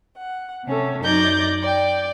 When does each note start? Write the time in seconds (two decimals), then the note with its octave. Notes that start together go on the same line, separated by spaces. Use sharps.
0.15 F#5
0.65 C3 C#4 A4
1.01 F#2 D#4 D5 G6 A#6
1.63 D5 G5